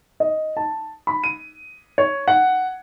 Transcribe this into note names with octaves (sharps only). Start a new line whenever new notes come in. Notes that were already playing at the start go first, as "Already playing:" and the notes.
D#5
A5
B5
D#7
C#5
F#5